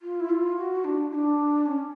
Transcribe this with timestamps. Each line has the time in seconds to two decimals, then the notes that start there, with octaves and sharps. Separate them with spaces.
0.02 F4
0.20 E4
0.30 F4
0.57 F#4
0.84 D4
1.11 E4
1.14 D4
1.66 C#4